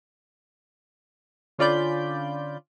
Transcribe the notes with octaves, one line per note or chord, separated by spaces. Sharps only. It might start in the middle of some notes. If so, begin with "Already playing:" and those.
D3 C#4 F4 D5 B5 G6